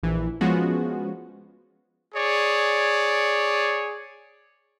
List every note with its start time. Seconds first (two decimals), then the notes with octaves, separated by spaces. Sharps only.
0.03 A#1 E3
0.41 F3 G#3 B3 C#4 F4 F#4
2.14 G#4 C#5 D5